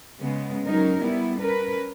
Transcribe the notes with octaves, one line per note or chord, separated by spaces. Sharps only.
C#3 G#3 B3
F#3 C#4 D#4 A#4
G3 B3 E4
C#4 A#4 B4